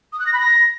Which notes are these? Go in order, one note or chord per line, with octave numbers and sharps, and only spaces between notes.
D#6
F#6
A#6
B5
A#6